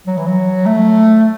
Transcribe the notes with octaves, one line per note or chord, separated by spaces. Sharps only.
F#3
E3
F#3
A3